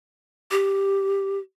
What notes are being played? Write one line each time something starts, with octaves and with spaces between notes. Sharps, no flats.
G4